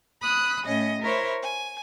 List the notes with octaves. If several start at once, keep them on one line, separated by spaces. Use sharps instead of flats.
B5 D#6 F#6
A2 C#4 D#5
E4 A#4 C5 C#5
G#5